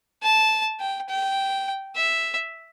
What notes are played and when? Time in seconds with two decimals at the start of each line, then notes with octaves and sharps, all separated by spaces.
0.23 A5
0.80 G5
1.09 G5
1.95 E5